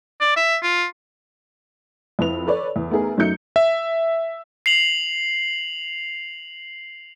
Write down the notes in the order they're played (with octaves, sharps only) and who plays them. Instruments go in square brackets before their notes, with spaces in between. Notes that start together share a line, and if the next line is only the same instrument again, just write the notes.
[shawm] D5
E5
F4
[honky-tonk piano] F2 E4 B4 F7
A4 B4 C#5 D5
E2
A3 B3 D#4 G#4 A#4
F#2 F#3 A3 D#4 G6 C#7
[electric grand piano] E5
[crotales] C7 F7 F#7